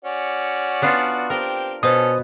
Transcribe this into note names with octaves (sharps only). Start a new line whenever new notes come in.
C#4 F#4 D5
B3 D4 F4
C4 G4 A#4
B2 C#4 A4 C5 D#6